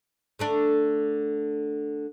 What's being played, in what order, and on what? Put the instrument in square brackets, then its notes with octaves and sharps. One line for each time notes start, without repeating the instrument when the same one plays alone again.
[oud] D3 A3 D4